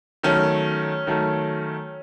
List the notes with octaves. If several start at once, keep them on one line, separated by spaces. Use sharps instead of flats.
D#3 F#3 A3 C#4
D#3 F#3 A3